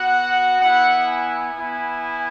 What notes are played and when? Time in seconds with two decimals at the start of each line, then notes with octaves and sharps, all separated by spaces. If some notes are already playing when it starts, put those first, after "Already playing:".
Already playing: B3 F#4 F#5
0.60 B3 E4 F#5
1.06 G#5
1.53 B3 E4